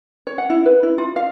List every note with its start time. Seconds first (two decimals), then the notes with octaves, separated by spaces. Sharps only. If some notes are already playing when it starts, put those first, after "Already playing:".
0.27 C#5
0.38 F#5
0.50 E4
0.66 B4
0.83 E4
0.98 F4
1.16 F5